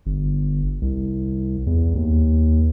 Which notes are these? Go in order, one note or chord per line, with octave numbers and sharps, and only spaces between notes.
G1
C2
E2
D#2